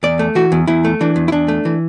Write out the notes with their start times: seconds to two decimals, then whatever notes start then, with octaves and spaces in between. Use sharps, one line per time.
0.03 E2 D5
0.19 A3
0.35 E3 F#4
0.52 E2
0.67 E2 E4
0.85 A3
1.01 E3 D4
1.16 E2
1.28 E4
1.32 E2 D4
1.48 A3
1.65 E3